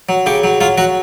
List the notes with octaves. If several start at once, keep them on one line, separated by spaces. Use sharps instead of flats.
F#3
C#3 G4
F#3
F#3 F4
F#3 F#4